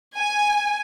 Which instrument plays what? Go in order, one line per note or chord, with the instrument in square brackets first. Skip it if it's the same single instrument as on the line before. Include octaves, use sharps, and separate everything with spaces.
[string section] G#5